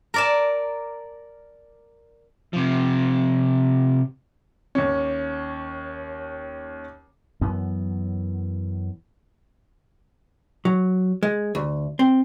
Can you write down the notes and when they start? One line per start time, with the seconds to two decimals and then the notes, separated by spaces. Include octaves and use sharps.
0.14 A#4 D5 A5
2.53 C3 F3
4.75 D#2 C#4
7.41 F#2 E3 B3
10.65 F#3
11.23 G#3
11.55 D2
11.99 C4